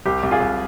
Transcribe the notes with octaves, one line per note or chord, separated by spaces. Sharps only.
C2 G4
C2
F4 G#4
C2